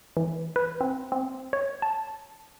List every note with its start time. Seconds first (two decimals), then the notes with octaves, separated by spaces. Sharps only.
0.17 E3
0.56 B4
0.81 C4
1.12 C4
1.53 C#5
1.82 A5